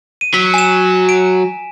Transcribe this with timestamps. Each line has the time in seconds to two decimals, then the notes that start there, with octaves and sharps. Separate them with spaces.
0.21 D#7
0.34 F#3 B6
0.54 G#5 E7
1.09 D7